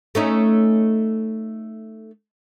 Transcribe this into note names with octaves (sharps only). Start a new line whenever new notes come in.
A3 C#4 D#4